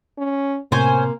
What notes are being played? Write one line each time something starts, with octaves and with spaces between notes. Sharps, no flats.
C#4
A2 C3 A#3 C#4 C5 G#5